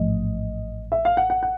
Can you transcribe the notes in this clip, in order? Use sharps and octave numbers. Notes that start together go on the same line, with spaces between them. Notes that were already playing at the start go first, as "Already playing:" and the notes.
Already playing: A1 G#2 F3 A3 D#5
E5
F5
F#5
F#5
F#5